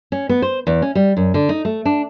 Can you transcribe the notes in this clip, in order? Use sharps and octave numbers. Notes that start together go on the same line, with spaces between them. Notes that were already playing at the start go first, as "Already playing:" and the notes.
C#4
B3
C5
E2
C#4
G3
F#2
D3
D#4
A3
D4